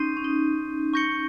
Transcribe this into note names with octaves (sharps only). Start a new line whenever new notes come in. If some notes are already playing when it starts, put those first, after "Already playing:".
Already playing: C#4 D#4 C6 G6 C7 D#7
C#4
D#4
C#6 G6 A#6 C#7 G7